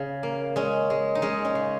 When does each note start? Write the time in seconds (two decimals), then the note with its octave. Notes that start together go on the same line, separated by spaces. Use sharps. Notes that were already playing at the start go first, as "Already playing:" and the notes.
Already playing: C#3
0.23 A#3
0.56 G#3 C#4
0.90 G#3
1.15 D#4
1.22 G#3 C#4
1.45 C#4
1.55 C#3